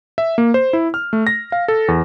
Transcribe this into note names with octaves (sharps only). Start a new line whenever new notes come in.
E5
A#3
C5
E4
F6
A3
A#6
F5
A4
E2